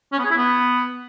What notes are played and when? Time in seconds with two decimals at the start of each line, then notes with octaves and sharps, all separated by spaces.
0.13 C#4
0.19 B3
0.25 G#4
0.31 E4
0.37 B3